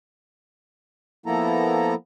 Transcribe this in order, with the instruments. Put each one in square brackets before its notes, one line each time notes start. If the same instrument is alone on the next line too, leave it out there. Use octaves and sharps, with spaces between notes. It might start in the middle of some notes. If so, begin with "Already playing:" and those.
[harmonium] F3 A#3 B3 E4 A4 A#5